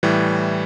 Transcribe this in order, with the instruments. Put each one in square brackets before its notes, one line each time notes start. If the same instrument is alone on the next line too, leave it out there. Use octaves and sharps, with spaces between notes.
[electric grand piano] A2 E3 G3